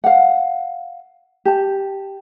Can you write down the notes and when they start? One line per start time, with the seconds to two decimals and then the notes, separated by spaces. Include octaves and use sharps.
0.04 F5 F#5
1.45 G4 A5